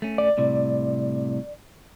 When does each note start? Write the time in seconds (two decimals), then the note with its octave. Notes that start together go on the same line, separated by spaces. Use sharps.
0.02 A3 C#4
0.18 D5
0.38 C2 A2 C3